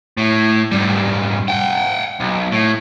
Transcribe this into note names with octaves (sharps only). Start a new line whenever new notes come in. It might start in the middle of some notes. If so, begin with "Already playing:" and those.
A2
G#2 G3
F#5 G5
B1
A2